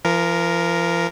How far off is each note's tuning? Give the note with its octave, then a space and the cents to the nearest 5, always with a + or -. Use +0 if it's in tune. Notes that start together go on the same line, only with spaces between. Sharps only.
F3 -40 A#4 +0